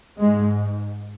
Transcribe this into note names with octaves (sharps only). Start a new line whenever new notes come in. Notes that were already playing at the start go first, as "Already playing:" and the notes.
G#2 G#3